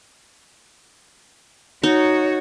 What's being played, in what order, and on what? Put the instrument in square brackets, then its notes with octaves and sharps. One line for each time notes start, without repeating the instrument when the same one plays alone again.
[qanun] D#4 [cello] F#4 C#5